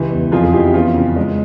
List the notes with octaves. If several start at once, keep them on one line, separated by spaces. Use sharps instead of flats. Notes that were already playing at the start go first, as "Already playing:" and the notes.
Already playing: C#2 E3 G4
E2
F2 F4 G#4
G#4
F2 E4 G4
E2 C#4 F4
C#3
G#3